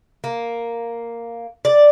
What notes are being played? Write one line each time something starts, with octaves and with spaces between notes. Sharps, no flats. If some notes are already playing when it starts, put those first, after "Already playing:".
A#3
D5